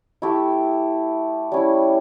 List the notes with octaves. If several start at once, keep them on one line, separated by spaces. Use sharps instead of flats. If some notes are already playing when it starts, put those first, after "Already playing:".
A3 E4 G4
G3 C#4 E4